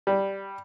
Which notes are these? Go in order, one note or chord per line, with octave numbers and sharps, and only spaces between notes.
G3